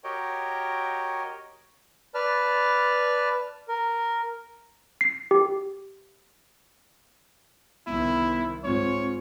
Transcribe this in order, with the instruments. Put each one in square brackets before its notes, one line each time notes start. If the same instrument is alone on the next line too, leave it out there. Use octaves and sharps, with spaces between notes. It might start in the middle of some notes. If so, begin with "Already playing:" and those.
[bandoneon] F#4 G4 A#4 C#5 D#5 G5
[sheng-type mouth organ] B4 D5 A5 F6
A#4
[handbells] C7
G4
[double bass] C2 D#3 [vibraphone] B3 [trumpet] E4
[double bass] G#2 [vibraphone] C4 F4 [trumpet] C#5